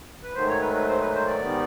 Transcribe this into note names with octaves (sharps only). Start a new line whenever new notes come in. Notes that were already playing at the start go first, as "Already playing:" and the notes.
B4
G#2 D#3 F#3 A3 C5
C#5
B4
B4
C5
B4
C5
D5
G#2 D#3 G3 B3